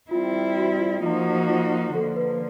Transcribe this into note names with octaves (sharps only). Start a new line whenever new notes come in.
G3 C4 E4 F4
F#4
F4
F3 A#3 D#4 F4 F#4
F4
D3 F3 A#3 A4
B4